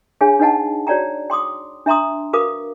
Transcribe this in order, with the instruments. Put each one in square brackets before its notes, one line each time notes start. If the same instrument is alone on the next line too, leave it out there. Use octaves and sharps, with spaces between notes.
[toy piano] D4 G#4 C#5 F5 G5 G#5
D4 D#4 B4 D#5 F#5 A5
F#4 C#5 D5 G5 A#5
G5 C6 D6 D#6
D4 E5 A#5 C6 D#6
F#4 A#4 B4 F5 D6 D#6